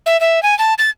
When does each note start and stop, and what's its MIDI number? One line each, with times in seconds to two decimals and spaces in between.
0.06 0.19 76
0.21 0.42 76
0.43 0.57 80
0.59 0.74 81
0.78 0.90 93